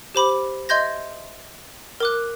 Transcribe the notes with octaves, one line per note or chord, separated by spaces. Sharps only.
G4 C5 B5 D6
D#5 E5 C6 G6 G#6 A#6
A#4 D6 F#6